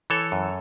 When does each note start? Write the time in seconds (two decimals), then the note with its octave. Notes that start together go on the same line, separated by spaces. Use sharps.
0.10 E3 A4 C#5
0.32 F#2